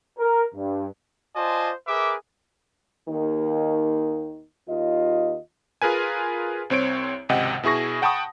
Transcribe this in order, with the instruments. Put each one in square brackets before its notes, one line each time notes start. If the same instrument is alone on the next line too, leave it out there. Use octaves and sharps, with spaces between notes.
[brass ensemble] A#4
G2
[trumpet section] F4 C5 D5 D#5 G#5 A5
G#4 A#4 B4 E5 D6
[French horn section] D#2 D#3
D#2 F4 D#5
[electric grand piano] F4 G#4 A#4 B4 G#5
C2 C4 C#5 D7
G#1 C#2 C3 D#5 F#5 G5
B2 E4 G#4 C#6 A#6
F#5 G5 A5 B5 C#6 D#6